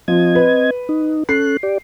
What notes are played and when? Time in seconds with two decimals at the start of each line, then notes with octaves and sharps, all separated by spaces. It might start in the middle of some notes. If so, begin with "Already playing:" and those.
0.08 F3 C4 D#5 G#6
0.35 B4
0.89 D#4
1.29 C#4 A4 F#6 C7
1.63 G4 D5